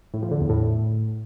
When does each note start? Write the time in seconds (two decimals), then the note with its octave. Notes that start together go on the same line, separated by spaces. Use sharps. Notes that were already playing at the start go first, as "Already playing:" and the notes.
0.14 A2
0.23 F3
0.31 D3
0.40 E2
0.49 A2